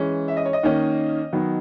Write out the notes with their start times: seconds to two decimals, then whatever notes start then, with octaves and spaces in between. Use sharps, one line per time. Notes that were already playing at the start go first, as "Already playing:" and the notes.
Already playing: E3 G#3 C#4
0.28 E5
0.37 D#5
0.46 C#5
0.53 D#5
0.63 D#3 A#3 C#4
1.33 D#3 F#3 B3